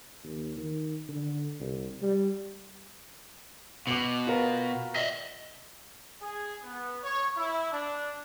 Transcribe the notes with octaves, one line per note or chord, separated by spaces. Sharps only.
D#2
D#3
D3
C2
G3
B2 F#4 D6
F4 A#4 B4
D#5 E5
G#4
B3
C#5
E4
D4